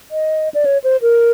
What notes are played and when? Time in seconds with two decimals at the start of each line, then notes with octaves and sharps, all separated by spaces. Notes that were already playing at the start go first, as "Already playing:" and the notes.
0.11 D#5
0.54 D5
0.65 C#5
0.84 C5
1.02 A#4